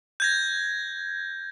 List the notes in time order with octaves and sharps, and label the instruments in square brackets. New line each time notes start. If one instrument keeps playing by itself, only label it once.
[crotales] G6 G#6 A#6